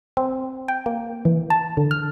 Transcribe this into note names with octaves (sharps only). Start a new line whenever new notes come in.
C4
G5
A#3
E3
A5
D3
F6